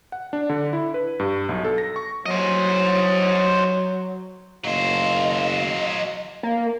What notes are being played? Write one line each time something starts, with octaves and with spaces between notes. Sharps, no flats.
F#5
D4
D3
E4
B4
G2
B1
A4
A#6
C#6
F#3 C5 D#5
F#1 F#3 C5 D#5 F5
A#3